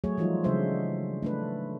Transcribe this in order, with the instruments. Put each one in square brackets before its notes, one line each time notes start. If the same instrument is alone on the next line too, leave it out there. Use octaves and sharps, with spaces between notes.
[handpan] F#3 A3 G#4 C#5
E3 F3 G3 D#4 F4
C#3 F#3 G#3 D4 C5 E5
A3 D4 B4